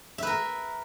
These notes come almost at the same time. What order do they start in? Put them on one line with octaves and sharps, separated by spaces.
E5 B4 A#4